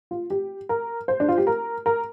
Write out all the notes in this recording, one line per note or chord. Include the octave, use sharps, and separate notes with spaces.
F4
G4
A#4
C5
D4
F4
G4
A#4
A#4